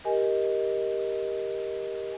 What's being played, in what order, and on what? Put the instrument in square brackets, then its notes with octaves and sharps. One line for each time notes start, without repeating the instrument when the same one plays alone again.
[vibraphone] G4 A#4 D#5 G#5